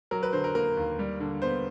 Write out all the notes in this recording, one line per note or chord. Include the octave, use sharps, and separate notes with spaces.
F#3 A#4
B4
D3 C5
A#4
A#3 A#4
D#2
G3
D3
B3 C5